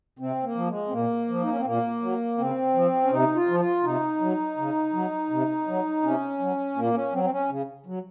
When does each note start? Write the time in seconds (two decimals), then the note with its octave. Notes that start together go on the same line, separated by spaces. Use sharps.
0.19 C3 C4
0.43 A#3
0.55 F3
0.68 G#3
0.87 C4
0.92 A#2 A#3
1.29 F3
1.42 D#4
1.50 C#4
1.58 C4
1.65 A#2 A#3
2.02 F#3
2.38 C#3 C4
2.74 F3
3.03 C#4
3.11 C3 D#4
3.35 F4
3.48 F3
3.60 F4
3.84 C3 D#4
4.20 F#3
4.57 C#3
4.93 F#3
5.30 C3
5.67 F#3
6.03 C3 C#4
6.39 F#3
6.76 A#2 A#3
6.94 C#4
7.13 F#3 C4
7.24 C4
7.31 C#4
7.49 C#3
7.86 F#3